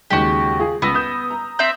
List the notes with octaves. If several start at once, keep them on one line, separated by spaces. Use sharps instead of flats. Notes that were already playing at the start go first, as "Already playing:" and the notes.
D#2 C#3 G#3 F#4 G4
F4 G#4
C#2 B3 E6 A#6
D#6 G6 E7
A#5
C4 E5 G6